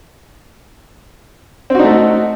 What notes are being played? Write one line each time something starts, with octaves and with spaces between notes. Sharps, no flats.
A3 C4 D#4 F#4